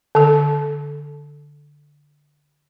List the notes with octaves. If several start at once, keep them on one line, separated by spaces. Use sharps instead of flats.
D3 A4